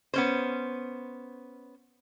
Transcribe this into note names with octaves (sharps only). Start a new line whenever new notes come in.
B3 C#4 C5